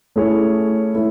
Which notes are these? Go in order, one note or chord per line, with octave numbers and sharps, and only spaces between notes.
A3 C#4 E4 G#4 C#5
A3 E4